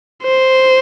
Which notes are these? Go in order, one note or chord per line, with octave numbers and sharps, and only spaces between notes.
C5